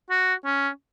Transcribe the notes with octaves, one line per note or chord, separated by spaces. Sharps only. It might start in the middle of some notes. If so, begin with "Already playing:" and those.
F#4
C#4